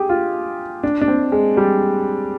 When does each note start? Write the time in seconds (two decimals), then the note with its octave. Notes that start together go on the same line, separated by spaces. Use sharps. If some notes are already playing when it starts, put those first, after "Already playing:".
Already playing: G4 G#4
0.09 F4
0.83 D4
1.01 D4
1.08 C4
1.32 G#3
1.57 G3